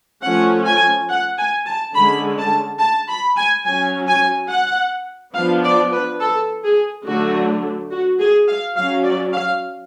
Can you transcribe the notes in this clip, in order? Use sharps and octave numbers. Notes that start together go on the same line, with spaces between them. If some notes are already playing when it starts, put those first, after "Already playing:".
F3 A3 C#4 F#5
G#5
F#5
G#5
A5
D3 G#3 C#4 B5
A5
A5
B5
G#5
F#3 C#4 G#5
G#5
F#5
F3 B3 D4 F5
D5
B4
A4
G#4
D3 F#3 A3 D4 F#4
F#4
G#4
F5
F#3 C#4 F5
D5
F5